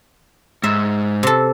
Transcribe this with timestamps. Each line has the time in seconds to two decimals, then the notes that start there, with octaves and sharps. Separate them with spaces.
0.64 G#2 E5
1.23 C3 A4